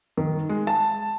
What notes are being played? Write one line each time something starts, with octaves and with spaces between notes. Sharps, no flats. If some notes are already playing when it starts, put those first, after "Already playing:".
D#3
G#3
A5